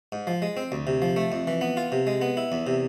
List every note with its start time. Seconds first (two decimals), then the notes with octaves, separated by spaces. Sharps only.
0.12 G#2
0.27 F3
0.42 G#3
0.57 C4
0.72 D2
0.87 C3
1.02 F3
1.16 A3
1.32 F2
1.47 E3
1.61 B3
1.77 F4
1.92 C3
2.07 G#3
2.21 B3
2.37 E4
2.52 E2
2.67 C3